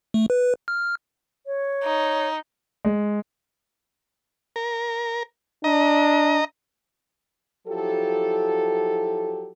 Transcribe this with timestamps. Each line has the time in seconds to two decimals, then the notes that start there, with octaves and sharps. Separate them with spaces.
0.14 A3
0.30 B4
0.68 F6
1.46 C#5
1.83 D#4
2.85 G#3
4.56 A#4
5.64 D4 D#5 A#5
7.68 F3 F#3 E4 G4 A4